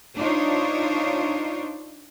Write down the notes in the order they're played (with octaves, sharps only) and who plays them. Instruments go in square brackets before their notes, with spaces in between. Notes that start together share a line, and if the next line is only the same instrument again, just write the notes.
[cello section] D4 D#4 F4 C5 C#5